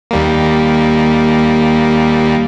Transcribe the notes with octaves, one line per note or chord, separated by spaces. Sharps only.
D#2 G3 A#3